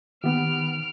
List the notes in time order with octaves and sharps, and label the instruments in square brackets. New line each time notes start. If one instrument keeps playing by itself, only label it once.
[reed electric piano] D#3 [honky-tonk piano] B3 G4 [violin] F6 D7